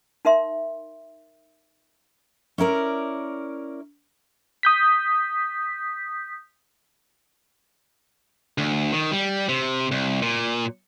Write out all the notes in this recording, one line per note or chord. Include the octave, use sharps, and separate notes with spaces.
D#4 A#4 E5 C6
C#4 E4 A#4 D5
D#6 G6 B6
D2
D#3
G3
C3
C2
A#2